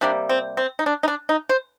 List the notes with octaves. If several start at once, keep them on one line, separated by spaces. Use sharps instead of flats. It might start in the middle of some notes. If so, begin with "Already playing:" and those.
C3 G3 A#3 D4
C4
C4
D#4
D4
D#4
D4
D#4
C5